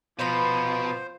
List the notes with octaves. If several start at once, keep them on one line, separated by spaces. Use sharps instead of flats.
B2 F3 B4 C5 A#5 B5